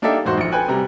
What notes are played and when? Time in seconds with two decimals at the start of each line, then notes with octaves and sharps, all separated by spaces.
0.02 A#3 D4 D#4 G4 A4 E5
0.24 E1 G#2 F#4 C5
0.38 A#1 C#7
0.52 A4 B4 G5 G#5 F#6
0.68 C3 G3 A#5